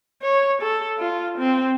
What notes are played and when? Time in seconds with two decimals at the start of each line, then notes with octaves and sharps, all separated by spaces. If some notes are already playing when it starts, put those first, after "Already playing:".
0.22 C#5
0.62 A4
0.98 F4
1.38 C4